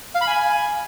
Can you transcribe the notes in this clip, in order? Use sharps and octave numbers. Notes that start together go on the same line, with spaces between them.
F5
B5
G#5